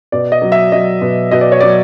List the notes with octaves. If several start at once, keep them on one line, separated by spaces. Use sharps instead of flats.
B2 D5
D#5
F#3
E5
F#3 D#5
B2
B2 D#5
D5
C#5
F#3 D5